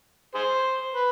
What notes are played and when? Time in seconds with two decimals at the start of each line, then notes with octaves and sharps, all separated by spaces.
0.35 G#4 C5
0.94 B4